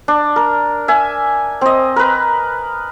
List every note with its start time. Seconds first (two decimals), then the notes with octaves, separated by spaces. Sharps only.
0.08 D4
0.36 A#4
0.88 E5 G#5
1.61 C4 D#5
1.96 A#4 B4